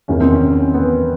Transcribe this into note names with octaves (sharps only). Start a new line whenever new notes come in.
E2 C3 D#3 C#4
C4
C#4
B3